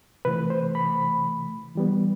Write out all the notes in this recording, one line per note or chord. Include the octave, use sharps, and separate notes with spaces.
C3 E3 A3 B4
C5
B5
E3 G3 B3